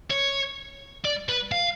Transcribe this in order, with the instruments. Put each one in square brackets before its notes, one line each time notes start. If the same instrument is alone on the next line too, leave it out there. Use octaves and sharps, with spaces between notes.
[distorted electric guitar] C#5
D5
B4
F5